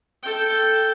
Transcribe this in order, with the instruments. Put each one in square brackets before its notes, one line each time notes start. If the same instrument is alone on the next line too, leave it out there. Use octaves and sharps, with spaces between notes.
[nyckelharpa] A4 G5